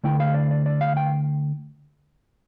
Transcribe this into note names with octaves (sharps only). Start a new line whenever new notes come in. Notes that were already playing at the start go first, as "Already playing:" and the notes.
D3 A3 E4 G5
F5
D5
D5
D5
F5
G5